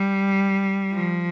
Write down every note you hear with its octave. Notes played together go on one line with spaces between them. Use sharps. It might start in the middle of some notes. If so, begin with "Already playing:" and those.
Already playing: G3
F3